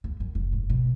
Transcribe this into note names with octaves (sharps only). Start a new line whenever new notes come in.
D#2
F#2
F1
G#2
B2